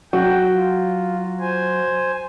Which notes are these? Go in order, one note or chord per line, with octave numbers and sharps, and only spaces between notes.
F#3 F#4 G5
F4
C5 G#5